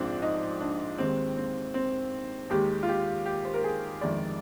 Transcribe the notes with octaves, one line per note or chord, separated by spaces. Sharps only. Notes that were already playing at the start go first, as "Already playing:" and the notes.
Already playing: A#1 G#2 F3 G#3 C4 D4
D#4
D4
D#2 D#3 G#3 C4
C4
C4
D#2 D#3 G#3 G4
F4
G4
G4
C5
A#4
G#4
G1 F2 D#3 G#3 D5